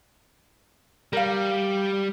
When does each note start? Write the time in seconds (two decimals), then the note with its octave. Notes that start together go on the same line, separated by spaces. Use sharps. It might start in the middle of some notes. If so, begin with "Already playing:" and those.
1.13 G3 A#4 F5